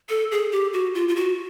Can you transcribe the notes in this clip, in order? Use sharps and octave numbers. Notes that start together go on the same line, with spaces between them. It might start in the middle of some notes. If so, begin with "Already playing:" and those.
A4
G#4
G4
F#4
F4
F4
F#4